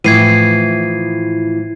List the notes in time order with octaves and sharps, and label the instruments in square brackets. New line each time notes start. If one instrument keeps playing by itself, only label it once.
[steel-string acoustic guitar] A2 E3 F3 [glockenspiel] G#6 C7 D#7